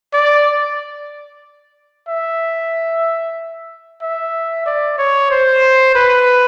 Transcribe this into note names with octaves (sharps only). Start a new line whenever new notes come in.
D5
E5
E5
D5
C#5
C5
B4